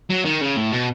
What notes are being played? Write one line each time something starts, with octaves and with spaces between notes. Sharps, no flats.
F#3
D#3
C#3
A2
B2